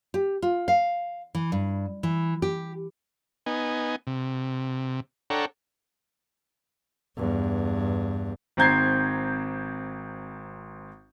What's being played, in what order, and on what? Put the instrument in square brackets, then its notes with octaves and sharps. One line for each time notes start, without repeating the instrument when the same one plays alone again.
[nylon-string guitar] G4
F4
F5
E3
G2
E3
G4
[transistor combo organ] B3 D#4 G#5
C3
D4 A4 C#5 F#5 G5 A#5
[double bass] E2 G2
[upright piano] G#1 C4 A#5 G6 G#6 C7